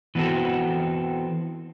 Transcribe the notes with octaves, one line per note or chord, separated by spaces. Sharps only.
E3 B3 C4 F#4 A4